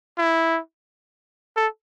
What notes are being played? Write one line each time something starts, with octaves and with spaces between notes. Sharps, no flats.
E4
A4